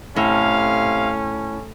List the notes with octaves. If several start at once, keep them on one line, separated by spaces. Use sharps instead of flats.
A2 C3 C#4 F5